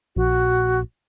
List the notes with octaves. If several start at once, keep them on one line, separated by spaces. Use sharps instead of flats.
A#1 F#4